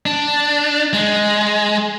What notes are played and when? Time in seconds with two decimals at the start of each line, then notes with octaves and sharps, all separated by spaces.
0.06 D4
0.93 G#3